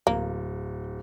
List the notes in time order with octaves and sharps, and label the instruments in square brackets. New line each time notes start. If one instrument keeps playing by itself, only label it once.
[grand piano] D1 [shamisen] A#3